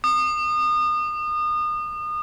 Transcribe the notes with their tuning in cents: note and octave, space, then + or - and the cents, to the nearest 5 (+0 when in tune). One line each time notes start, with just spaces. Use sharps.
D#6 -30